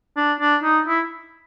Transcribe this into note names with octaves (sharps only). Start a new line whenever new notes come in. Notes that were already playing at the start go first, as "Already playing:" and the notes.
D4
D4
D#4
E4